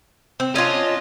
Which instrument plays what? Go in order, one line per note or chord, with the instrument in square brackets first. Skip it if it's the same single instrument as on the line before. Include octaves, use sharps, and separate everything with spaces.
[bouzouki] C4
[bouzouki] C#4 D4 F4 [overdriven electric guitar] D#5